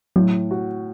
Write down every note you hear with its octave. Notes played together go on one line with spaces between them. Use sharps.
A2 F#3
F#4